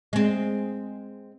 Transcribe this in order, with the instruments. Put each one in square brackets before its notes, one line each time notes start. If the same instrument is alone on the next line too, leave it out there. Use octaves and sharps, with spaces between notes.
[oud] G#3 C4